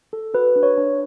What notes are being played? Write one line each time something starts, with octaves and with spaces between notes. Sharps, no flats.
A4
F#4 B4
D4
C#5
D4